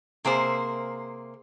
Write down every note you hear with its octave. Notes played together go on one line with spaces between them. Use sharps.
C3 A#3 G#4 C5